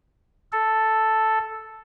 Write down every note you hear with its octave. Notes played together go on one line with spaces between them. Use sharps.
A4